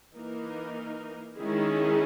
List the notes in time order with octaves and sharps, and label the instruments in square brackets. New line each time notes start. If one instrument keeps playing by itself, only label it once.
[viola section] E3 A#3 D#4 A#4
D#3 G#3 C#4 E4 G#4